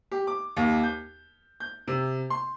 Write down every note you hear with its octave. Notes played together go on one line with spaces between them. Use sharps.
G4
D6
D#2
G6
G6
C3
C6